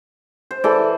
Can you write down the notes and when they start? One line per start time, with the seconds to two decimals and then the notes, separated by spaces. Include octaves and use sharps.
0.51 C5
0.64 E3 A4 D5